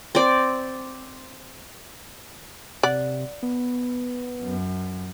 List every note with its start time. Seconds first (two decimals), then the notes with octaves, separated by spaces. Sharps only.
0.15 C4 D5
2.83 C3 D5 F#5
3.43 B3
4.42 F#2